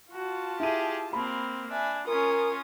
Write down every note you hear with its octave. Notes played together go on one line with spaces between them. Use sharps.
F4 F#4 A5
E4 G4 G#4 D#7
A#3 C4 B5
D4 E5 G#5
C#4 F4 A#4 G#5 D#6